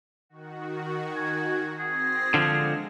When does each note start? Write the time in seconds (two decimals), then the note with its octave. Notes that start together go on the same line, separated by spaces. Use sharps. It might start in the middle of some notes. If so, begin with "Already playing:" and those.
0.29 D#3 F#4
1.16 G#5
1.79 C4 G#4 A#6 C7
2.34 D3 F3 G#3